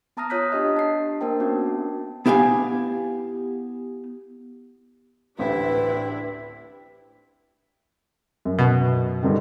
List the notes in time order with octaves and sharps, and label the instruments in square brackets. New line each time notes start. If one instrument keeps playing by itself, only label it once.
[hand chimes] B3 A5 A#5 D#6 F6 A#6
F4 C#5 D#6 F#6 G6 B6
D4 G4 D#5
A5 C7
A#3 D4 A#4 C5 G5 A5
B3 C#4 F#4
[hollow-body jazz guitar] B3 E4 G4 F5 G#5
[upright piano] A1 D2 [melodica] C4 E5 [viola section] D4 E4 G4 [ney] B4
[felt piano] F#2
[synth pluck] B2
[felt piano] G2 D3 D#3